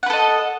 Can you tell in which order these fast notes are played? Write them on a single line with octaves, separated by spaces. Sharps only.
F#5 B4 A4 D#5